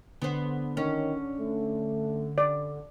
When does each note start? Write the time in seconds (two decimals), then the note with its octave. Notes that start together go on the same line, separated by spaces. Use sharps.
0.22 D3 B3 C5
0.77 D#3 C#4
1.39 A3
2.38 D5